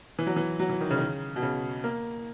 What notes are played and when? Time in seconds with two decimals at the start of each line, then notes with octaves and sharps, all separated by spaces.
0.19 E3
0.27 F#3
0.36 E3
0.59 F#3
0.70 E3
0.81 D#3
0.91 C#3
0.97 D#3
1.01 C#3
1.36 B2
1.42 C#3
1.84 A#3